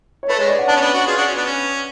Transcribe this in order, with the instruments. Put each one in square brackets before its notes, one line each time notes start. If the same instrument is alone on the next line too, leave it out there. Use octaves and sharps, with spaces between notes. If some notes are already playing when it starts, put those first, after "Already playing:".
[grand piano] C#5
[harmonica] A3 [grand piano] B4
[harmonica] G#3 [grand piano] C#5
[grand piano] D5
F#5
[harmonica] B3 D4 [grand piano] A5
[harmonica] C#4
B3 D4
D4 F#4
F4 G#4
D4 F#4
C#4
B3 D4
C#4